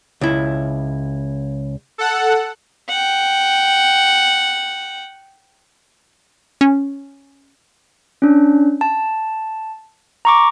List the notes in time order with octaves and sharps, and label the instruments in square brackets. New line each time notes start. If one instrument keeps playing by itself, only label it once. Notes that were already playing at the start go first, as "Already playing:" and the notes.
[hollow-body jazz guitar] C#2 E4
[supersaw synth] A4 F#5
[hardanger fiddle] F#5 G5
[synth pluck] C#4
[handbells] C#4 D4
A5
A#5 C#6 D6